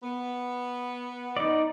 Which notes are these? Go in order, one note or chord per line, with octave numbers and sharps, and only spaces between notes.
B3
D#4 D5